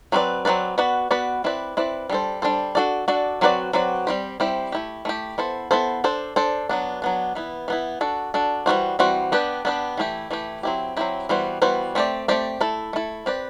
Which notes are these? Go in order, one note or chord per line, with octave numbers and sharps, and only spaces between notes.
F#3 C4 F#4 B4 D5
F#3 C4 F#4 B4 D5
B3 F#4 B4 D5
B3 F#4 B4 D5
C4 E4 B4 D5
C4 E4 B4 D5
G3 D4 A4 C5
G3 D4 A4 C5
D4 F#4 A4 D5
D4 F#4 A4 D5
F#3 C4 F#4 B4 D5
F#3 C4 F#4 B4 D5
G3 C4 E4 G4 C5
G3 C4 E4 G4 C5
A3 E4 G4
A3 E4 G4
B3 E4 A4 C5
B3 E4 A4 C5
D4 A4 C5
D4 A4 C5
F#3 B3 D4
F#3 B3 D4
E3 B3 E4
E3 B3 E4
D4 F#4 A4
D4 F#4 A4
E3 G3 C4 F#4 C5
E3 G3 C4 F#4 C5
B3 D4 G4 B4
B3 D4 G4 B4
E3 A3 E4 G4
E3 A3 E4 G4
F#3 C4 E4 G4
F#3 C4 E4 G4
E3 G3 B3 F#4 C5
E3 G3 B3 F#4 C5
A3 C4 G4 D5
A3 C4 G4 D5
A3 E4 A4
A3 E4 A4
C4 G4 B4 D5